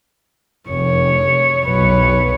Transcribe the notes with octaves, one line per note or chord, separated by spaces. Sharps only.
F1 C#5
B1 B4 C#5